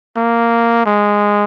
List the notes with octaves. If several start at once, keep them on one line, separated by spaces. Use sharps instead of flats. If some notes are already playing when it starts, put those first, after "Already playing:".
A#3
G#3